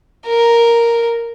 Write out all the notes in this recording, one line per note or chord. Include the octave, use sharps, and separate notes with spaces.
A#4